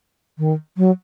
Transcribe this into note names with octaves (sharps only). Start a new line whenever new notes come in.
D#3
F#3